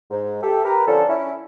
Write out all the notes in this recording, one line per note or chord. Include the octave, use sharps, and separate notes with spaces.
G#2
G4 A4 E5
G4 A#4 B4
D3 F3 C#4 D4 A4
C#4 E4